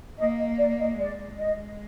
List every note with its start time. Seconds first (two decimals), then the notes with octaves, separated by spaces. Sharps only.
0.19 A#3 D#5
0.38 D#5
0.58 D5
0.79 D#5
0.99 G#3 D5
1.38 D#5